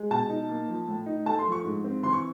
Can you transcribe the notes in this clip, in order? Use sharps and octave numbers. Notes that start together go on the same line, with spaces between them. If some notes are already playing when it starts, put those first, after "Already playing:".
Already playing: G#3
B2 A5
D#4
A#3
F3
A2
D#4
A3 A5
C6
F3
C#6
G#2
C4
E3 C6
C#6